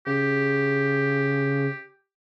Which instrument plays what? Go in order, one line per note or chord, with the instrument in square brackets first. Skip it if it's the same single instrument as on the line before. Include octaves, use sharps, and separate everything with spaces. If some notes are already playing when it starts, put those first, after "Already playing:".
[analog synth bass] C#3 [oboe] G4